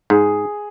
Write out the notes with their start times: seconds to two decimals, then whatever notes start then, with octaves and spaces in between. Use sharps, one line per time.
0.10 G#2 G#4